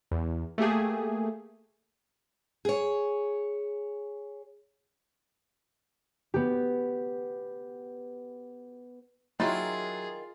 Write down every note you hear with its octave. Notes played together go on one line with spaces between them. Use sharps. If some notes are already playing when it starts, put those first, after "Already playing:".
E2
A3 A#3 G4 G#4
G#4 C#5
B3 G4
D#3 F#3 E4 F4 G#4 A6